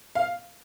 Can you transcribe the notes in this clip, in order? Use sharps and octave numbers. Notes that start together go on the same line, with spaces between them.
F5